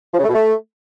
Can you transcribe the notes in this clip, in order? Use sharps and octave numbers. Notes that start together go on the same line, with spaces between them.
F3
C#3
A3
B2
A3